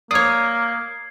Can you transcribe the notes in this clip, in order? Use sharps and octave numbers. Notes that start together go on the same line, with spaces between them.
A#3 C#5 D5 D#6 G#6 C7